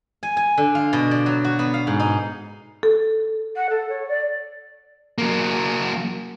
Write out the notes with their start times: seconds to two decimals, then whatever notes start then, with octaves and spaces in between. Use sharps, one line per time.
0.23 G#5
0.37 G#5
0.57 D3
0.75 F4
0.93 B2
1.11 D5
1.26 F#3
1.44 F#4
1.59 B3
1.74 F5
1.87 G#2
2.00 D#4
2.83 A4
3.56 F#5
3.69 A4
3.89 C#5
4.08 D5
5.18 F#3 A#3